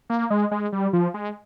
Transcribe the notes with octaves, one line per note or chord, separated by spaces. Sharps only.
A#3
G#3
G#3
G3
F3
G#3